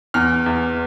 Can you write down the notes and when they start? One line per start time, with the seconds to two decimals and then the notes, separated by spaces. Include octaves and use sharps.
0.14 E2 F6
0.46 E2